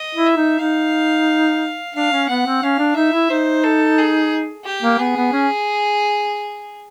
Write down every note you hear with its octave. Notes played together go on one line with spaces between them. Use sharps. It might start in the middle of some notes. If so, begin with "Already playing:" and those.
Already playing: D#5
E4
E5
D#4
D#4 F5
D4 F5
C#4
B3 F#5
C4
C#4 F5
D4
D#4 E5
E4
D#4 C5
A4
G#4
G4
A#3
B3 G#4
B3
C#4